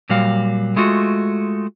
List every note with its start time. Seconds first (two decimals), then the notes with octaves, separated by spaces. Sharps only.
0.10 A#2 F#3 G3 F5
0.76 G#3 A3 F4 F#4